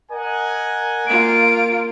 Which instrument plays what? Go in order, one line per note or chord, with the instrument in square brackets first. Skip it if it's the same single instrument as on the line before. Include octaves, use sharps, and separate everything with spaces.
[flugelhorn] A#4 [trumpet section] D#5 F#5 G#5
[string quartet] A#3 F4 [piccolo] D7